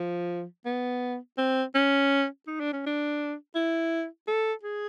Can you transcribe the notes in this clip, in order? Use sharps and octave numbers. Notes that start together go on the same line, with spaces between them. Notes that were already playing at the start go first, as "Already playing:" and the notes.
Already playing: F3
B3
C4
C#4
D#4
D4
C#4
D4
E4
A4
G#4